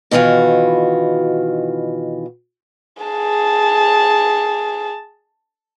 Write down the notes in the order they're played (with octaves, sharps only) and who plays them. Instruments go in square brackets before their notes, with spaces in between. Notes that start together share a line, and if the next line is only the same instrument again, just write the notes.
[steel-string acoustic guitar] B2 D#3 E3 F4 F#4
[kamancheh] G#4 A5